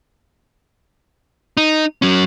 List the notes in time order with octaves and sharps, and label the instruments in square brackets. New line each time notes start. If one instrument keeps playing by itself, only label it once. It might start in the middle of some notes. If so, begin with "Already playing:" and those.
[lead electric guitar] D#4
F#3 C#4